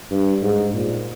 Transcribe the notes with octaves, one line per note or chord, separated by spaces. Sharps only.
G2
G#2
A#2